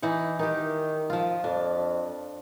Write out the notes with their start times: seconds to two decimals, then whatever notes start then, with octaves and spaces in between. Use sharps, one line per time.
0.02 E3 D#4 F#5
0.39 D#3 D#4 G4
1.10 F3 F4
1.44 F2 D4